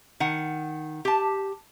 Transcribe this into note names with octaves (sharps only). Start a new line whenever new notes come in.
D#3 F#5
G4 A5